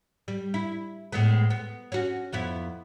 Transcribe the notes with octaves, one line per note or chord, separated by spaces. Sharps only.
G3
E4
A2 G#3 B3
B3
C#4 F#4
F2 B3 E4